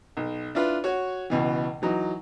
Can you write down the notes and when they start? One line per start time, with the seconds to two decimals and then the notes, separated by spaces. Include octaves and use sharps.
0.17 B1
0.55 D4 E4 F4 B4
0.84 F#4 C#5
1.30 C#2 B2 E3
1.82 E3 F#3 D#4